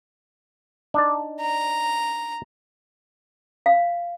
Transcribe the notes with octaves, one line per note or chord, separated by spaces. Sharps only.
D4 D#4 D5
A#5
F5